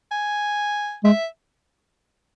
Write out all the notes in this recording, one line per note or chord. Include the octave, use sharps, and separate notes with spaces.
G#5
G#3 E5